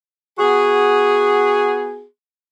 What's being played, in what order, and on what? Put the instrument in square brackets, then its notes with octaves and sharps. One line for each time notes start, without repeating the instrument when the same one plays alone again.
[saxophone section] B3 F#4 G#4